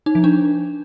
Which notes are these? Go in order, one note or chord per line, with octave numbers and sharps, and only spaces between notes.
D#4
F3
D4